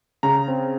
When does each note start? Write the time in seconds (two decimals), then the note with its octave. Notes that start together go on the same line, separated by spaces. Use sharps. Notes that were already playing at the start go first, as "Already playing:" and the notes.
0.23 C#3 A#5
0.48 C4